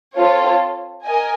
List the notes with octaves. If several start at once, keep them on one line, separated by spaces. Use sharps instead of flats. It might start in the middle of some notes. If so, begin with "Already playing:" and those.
C4 F4 A4 C#5
A#4 D#5 G#5